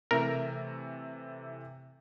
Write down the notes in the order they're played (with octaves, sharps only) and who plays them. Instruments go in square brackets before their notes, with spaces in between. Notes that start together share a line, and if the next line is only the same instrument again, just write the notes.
[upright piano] C3 E3 A3 [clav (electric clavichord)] A#4